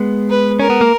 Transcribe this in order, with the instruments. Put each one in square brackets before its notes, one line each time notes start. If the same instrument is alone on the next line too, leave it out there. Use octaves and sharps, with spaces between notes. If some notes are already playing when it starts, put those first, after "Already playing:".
Already playing: [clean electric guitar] G#3 B3
[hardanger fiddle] B4
[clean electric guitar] C#4 [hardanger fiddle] A#4
[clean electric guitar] B3
A#3